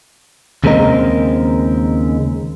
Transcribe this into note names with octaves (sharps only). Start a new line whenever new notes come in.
D#2 C#3 G#3 C4 A#4 D#5